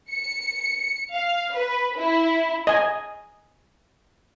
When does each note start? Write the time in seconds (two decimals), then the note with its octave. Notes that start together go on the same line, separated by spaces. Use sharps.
0.11 C#7
1.11 F5
1.54 B4
1.97 E4
2.67 D#5 G#5